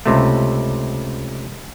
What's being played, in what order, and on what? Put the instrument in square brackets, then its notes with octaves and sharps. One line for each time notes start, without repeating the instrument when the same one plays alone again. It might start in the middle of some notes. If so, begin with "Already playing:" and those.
[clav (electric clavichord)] C#2 C3 A3